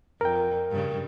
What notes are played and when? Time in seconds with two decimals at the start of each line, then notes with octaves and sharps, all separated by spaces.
0.21 F2 A#4 G5
0.71 G2 C#3